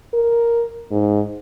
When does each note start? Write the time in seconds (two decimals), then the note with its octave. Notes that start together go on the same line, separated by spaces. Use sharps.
0.14 A#4
0.91 G#2